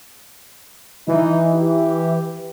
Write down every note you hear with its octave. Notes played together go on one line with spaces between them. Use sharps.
E3 D#4
G4